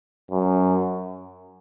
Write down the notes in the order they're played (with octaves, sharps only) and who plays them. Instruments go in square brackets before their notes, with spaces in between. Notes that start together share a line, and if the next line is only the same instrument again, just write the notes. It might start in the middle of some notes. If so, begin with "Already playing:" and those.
[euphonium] F#2